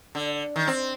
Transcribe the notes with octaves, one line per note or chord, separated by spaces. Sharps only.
D3
D#3
C4